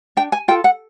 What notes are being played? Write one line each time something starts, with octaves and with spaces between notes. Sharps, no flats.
D4 G5
G#5
F4 A4 G5
F#5